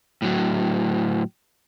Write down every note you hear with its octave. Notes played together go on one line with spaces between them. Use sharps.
A2 F#3